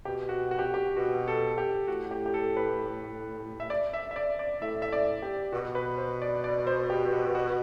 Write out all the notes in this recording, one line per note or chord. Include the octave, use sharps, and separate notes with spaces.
B2 G4
F#4
F#4
G4
F#4
G4
B2 F#4
A4
G4
A2 F#4
G4
G4
A4
B4
E5
D5
E5
E5
D5
D5
A2 E5
E5
D5
G4
B2 F#4
B4
C5
D5
D5
C5
G4
F#4
F#4